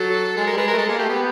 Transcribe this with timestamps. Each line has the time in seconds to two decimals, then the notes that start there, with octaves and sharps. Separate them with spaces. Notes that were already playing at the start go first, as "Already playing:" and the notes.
Already playing: F#3 A4
0.37 G#3 A4
0.47 A#4
0.53 G3
0.57 G#3 B4
0.68 A#4
0.73 A3
0.78 G#3 A4
0.89 A#3 G#4
0.99 A3 G4
1.09 B3 G4